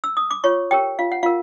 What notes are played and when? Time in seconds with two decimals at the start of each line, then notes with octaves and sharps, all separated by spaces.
0.04 E6
0.17 D#6
0.31 D6
0.44 F4 C#5 C#6
0.71 G4 A#4 C#5 G5
0.99 F4 F5
1.12 F#5
1.23 F4 A#4 F5